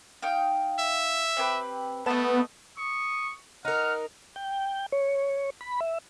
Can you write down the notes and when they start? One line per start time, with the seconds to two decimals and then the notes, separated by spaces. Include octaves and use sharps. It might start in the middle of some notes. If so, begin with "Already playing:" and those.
0.22 D#4 F5 G5
0.79 E5
1.37 C4 G4 B4
2.06 A3 B3 D#5 A5
2.78 C#6 D#6
3.65 D#4 A#4 F#5 F6
4.36 G5
4.92 C#5
5.61 B5
5.80 E5